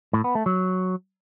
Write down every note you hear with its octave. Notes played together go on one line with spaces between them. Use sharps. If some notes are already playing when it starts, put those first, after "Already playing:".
A2
B3
A3
F#3